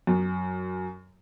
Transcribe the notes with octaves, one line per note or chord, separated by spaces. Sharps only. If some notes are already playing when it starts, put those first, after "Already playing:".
F#2